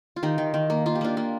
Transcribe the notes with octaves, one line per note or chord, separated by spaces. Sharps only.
F4
D#3 D#4 G4
D#3
D#3
A#3
A#3 F4
G4
A#3 D4 F4
A#3